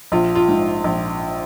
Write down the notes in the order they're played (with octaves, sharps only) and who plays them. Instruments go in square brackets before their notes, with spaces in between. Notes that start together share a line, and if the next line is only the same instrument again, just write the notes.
[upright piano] A#1 F4
F4
G#2
A#1